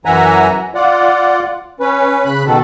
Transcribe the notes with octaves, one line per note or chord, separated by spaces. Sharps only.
F#2 E3 E5 F#5 G#5 A#5
F4 D5 F#5
C#4 B4
C#3 B5 F#6
B2 D#3 A4